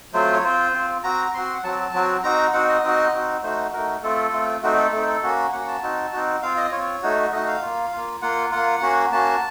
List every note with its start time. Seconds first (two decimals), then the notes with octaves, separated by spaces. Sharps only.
0.13 F#3 A3 C4 F4 C5
0.35 C#5
0.44 C4 F4 C5
0.74 C4 F4
1.04 C4 F#4 A#5
1.26 A#5
1.34 C4 F#4 C6
1.54 F#5
1.63 F#3 C4 F#4 A5
1.94 F#3 C4 F#4
2.23 C4 D#4 F#4 A#5
2.53 C4 D#4 F#4 F#5
2.68 D#5
2.83 C4 D#4 F#4
3.14 C4 D#4 F#4
3.43 A3 D#4 F#4 C5
3.73 A3 D#4 F#4 A#4
4.03 A3 C4 F4 A4
4.33 A3 C4 F4
4.63 A3 C4 D#4 F#4
4.78 A4
4.93 A3 C4 D#4
5.23 A#3 C#4 F#4
5.53 A#3 C#4 F#4 F#5
5.68 A5
5.83 C4 D#4 F#4
6.13 C4 D#4 F#4
6.43 C4 F4 F5
6.57 D#5
6.72 C4 F4 C#5
7.03 A3 D#4 F#4
7.32 A3 D#4 F#4 D#5
7.48 F5
7.62 A#3 F4
7.93 A#3 F4
8.22 A#3 F4 F#5
8.52 A#3 F4 F#5
8.82 A#3 C#4 F#4
9.12 A#3 C#4 F#4 A5